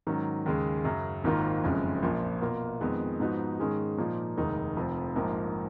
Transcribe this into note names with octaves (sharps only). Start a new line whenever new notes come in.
G#2 D#3 F#3 C#4
D#2 C#3 G#3
F#2 C#3 F#3
G#1 G#2 D#3 A#3 F4
F#1 F2 C#3 G#3 C#4
A#1 A#2 F3
B2 A#3 F4
F2 D#3 G#3 B3
G#2 F3 B3 D#4 F#4
G#2 D#3 G#3 C#4 G#4
A#2 F3 A#3 D#4
F1 D#2 D#3 G#3 D#4
F1 F2 F3
A#1 G#2 F3 A#3